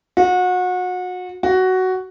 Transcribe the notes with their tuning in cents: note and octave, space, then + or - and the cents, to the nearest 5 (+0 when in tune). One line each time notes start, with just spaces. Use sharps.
F#4 -30
F#4 +10